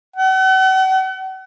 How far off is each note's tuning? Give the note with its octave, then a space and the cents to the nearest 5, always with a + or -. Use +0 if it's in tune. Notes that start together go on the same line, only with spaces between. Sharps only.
F#5 +40